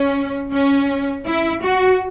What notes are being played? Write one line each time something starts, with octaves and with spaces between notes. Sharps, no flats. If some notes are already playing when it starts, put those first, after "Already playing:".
Already playing: C#4
C#4
E4
F#4